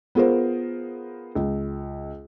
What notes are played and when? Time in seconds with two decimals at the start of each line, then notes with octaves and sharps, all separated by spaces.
0.15 B3 F4 G#4 A#4 C5
1.35 C#2